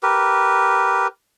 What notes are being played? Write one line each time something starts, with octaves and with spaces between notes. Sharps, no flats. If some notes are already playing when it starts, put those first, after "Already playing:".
G4 A#4 B4